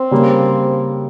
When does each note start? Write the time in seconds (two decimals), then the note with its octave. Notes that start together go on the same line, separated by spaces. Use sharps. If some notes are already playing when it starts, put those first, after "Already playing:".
Already playing: C4
0.11 C#3 G3 A#3